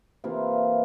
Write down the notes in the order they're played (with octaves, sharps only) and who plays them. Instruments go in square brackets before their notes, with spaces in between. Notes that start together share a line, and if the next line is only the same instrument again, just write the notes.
[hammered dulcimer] C3 E3 A#3 F4